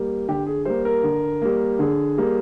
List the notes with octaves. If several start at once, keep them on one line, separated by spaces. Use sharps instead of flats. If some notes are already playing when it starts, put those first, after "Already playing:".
Already playing: G3 A#3
D3 G4
G#4
G3 A#3 C5
A#4
D3
G3 A#3
D3 G#4
G3 A#3